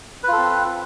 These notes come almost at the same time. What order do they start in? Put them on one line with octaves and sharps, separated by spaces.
B4 F4 A4 C4